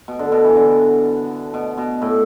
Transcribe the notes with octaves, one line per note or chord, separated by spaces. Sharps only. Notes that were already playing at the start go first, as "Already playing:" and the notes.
B2
D3
B2
E3
D3
B2
B2
A2